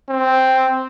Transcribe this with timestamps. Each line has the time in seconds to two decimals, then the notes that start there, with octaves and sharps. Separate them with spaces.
0.10 C4